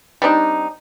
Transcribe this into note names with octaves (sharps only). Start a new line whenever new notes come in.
G3 C4 D4 D#4